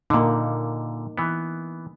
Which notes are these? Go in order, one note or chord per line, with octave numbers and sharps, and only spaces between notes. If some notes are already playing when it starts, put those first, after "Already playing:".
A#2 D3 A#3 D#4
E3 B3